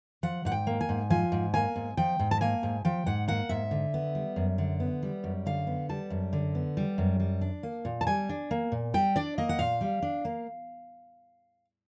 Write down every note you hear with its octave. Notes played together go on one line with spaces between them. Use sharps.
F3 F#5
G#2 F#5
G5
A#3
G#5
G#2
F3 G#5
G#2
A#3 G#5
G#2
F3 G5
G#2
A5
A#3 G#5
G#2
F3 G5
G#2 F#5
A#3 F#5
G#2 E5
D3
B3
G3
F#2
D3
B3
G3
F#2
D3 F5
B3
G3 A5
F#2
D3
B3
G3
F#2
G3
D4
A#3
A#2
A5
G3 G#5
D4
A#3
A#2
G3 G5
D4 D5
A#3 D#5
F#5
A#2 F5
G3
D4
A#3